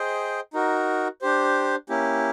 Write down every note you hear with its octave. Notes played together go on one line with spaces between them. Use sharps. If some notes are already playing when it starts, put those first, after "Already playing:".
Already playing: G#4 C5 D#5 G5
D#4 F#4 A#4
D4 G4 C5
A#3 C#4 E4 G4